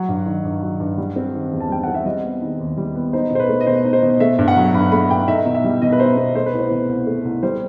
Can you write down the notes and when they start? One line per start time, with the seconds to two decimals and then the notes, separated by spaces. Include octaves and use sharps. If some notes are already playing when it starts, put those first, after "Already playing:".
Already playing: F#3 F#5
0.09 G2
0.26 D#3
0.44 G2
0.62 F#3
0.80 G2
0.98 G3
1.16 C4
1.34 D#3
1.52 E2
1.60 A5
1.70 G3 G5
1.84 C4 F#5
1.94 E5
2.06 G3 D#5
2.23 B3
2.41 D#3
2.60 D#2
2.77 G3
2.95 B3
3.13 D#4 C5
3.31 B2 C5
3.40 B4
3.49 A3
3.61 D#5
3.67 B2 C5
3.85 D#4
3.93 C5
4.03 B2
4.20 A3 E5
4.39 G2
4.48 F#5
4.56 F#3
4.74 G2 B5
4.92 A3 B5
5.10 G2 G5
5.28 D#4 E5
5.46 B2
5.55 E5
5.64 G3
5.82 B2 D#5
5.92 B4
5.99 D#4 C5
6.17 B2 B4
6.35 A3 C5
6.46 B4
6.53 C2
6.59 C5
6.71 B2
6.89 C2
7.07 A3
7.25 C2
7.43 G3 C5